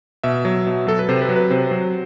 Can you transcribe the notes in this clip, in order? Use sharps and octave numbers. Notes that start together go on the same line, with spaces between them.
B2 E5
F#3
B2
F#3 A4
B4
C3 C5
B4
F#3
B4
C3 C5
F#3